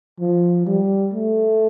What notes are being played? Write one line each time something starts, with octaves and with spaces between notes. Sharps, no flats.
F3
G3
A3